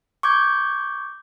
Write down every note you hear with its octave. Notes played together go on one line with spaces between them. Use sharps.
C#6 D6 G6 G#6